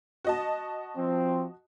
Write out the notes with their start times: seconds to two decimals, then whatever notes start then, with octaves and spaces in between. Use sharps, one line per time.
0.25 F#4 D#5 A5
0.96 F3 C4